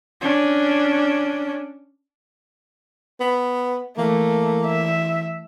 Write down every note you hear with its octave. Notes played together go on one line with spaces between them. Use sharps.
C#4 D4
B3
E3 A3 A#3
E5